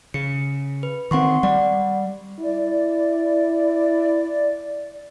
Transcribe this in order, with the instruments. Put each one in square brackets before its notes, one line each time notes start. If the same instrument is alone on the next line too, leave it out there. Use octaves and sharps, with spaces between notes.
[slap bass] C#3 [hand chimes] C#7
[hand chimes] B4
[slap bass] D#3 C4 [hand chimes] F#5 C6 C#6
[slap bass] G3 [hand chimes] D5 F#5
[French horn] E4 [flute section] D5